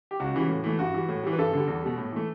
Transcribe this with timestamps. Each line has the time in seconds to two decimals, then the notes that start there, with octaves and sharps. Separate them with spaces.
0.11 G4
0.20 C#2 F#4
0.34 C#3 E3 G3
0.49 A2
0.64 E3 A3
0.79 G2 F#4
0.94 E3 G3
1.09 A2
1.23 E3 G3
1.33 B4
1.38 G2 A4
1.53 D3 G3
1.68 E2
1.82 B2 G3
1.98 A2
2.12 E3 A3